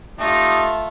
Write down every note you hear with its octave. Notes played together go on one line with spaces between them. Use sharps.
G3 A3 D#4 F4